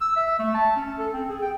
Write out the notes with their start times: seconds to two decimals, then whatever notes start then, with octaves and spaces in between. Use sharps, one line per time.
0.01 E6
0.16 E5
0.39 A3
0.54 A5
0.76 C#4
0.98 A4
1.13 C4
1.29 G#4
1.42 G5